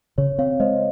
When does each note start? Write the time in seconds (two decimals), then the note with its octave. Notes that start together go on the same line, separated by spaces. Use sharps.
0.18 C#3 C#5
0.38 C4 C#5 F5
0.60 G#3 C5 D#5